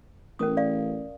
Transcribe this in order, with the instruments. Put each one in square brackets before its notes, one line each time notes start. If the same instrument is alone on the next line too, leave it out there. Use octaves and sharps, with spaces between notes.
[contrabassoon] A1 [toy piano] C#4 A#4 D#6
[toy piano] D5 F5